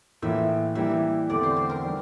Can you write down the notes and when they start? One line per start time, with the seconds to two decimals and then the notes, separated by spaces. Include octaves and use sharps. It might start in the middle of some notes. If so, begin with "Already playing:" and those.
0.22 A2 E3 A#3 F4 E5
0.75 E3 G3 A#3 E4 G4 E5
1.29 E2 D3 A3 C4 G4 D5
1.43 C5
1.56 C5
1.70 A#4
1.83 E3 G3 D4 G4